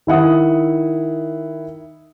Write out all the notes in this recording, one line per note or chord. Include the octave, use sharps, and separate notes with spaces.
D#3 E4 F#5 D#6